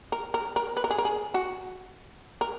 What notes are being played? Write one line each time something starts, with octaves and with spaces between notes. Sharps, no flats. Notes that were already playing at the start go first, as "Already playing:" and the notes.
A#4
A#4
A#4
B4
A#4
G#4
A#4
G#4
F#4
A#4